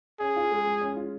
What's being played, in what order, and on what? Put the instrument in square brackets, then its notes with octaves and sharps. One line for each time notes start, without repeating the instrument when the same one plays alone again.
[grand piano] C#4 [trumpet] G#4
[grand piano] F4
G#3
G#3
C#4
F4